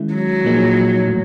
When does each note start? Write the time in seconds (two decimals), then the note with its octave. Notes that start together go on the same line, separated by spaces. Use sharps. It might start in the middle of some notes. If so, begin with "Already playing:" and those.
Already playing: D#3 G#3 C#4 E4
0.14 F#3
0.44 A#2 F3 A#3 D#4 G#4
1.07 A2 E3 A3